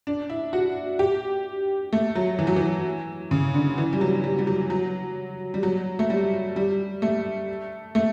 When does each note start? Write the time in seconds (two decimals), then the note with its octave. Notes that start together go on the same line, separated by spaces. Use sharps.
0.07 D4
0.30 E4
0.53 F#4
0.99 G4
1.93 A3
2.15 F#3
2.39 E3
2.47 F#3
2.56 E3
3.31 C#3
3.54 D3
3.78 E3
3.93 G3
4.01 F#3
4.24 G3
4.39 G3
4.47 F#3
4.70 F#3
5.54 G3
5.63 F#3
5.99 A3
6.10 G3
6.56 G3
7.02 A3
7.95 A3